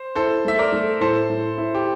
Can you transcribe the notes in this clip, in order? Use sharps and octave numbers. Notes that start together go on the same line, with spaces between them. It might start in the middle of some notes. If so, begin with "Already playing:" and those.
Already playing: C5
E4 A4 C5
A3 E5
A#4 D5
A3
A2 A4 C5
A2
E4
G4